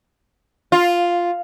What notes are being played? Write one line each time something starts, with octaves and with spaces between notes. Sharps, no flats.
F4